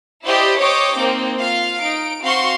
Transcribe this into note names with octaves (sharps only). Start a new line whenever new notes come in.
E4 G4 C5 D5 D#5
C5 C#5 D#5 G5 D6
A#3 C4 D#4
F4 F5
D#4 D7
C4 F#4 F5 C6 C#6